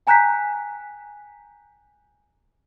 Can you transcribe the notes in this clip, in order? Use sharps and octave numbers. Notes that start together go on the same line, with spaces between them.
G5 G#5 A#5 F#6 G6 B6